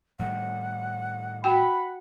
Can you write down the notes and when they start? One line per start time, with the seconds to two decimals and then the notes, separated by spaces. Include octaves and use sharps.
0.19 A2 D#3 G3 F#5
1.44 F#4 F#5 G5 B5